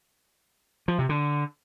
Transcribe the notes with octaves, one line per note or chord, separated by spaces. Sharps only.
F3
C3
D3